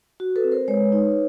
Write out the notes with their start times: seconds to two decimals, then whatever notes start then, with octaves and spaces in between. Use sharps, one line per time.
0.20 F#4
0.36 A4 B4
0.44 C4
0.52 A#4 C5
0.68 G#3 B4 C#5
0.92 D#4